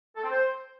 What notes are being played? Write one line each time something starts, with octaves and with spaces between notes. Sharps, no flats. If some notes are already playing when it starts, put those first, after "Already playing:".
A4
C4
C5